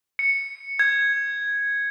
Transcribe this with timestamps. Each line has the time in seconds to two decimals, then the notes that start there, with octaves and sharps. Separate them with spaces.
0.19 C#7
0.79 G#6